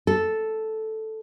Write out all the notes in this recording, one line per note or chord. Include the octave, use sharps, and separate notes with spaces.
A4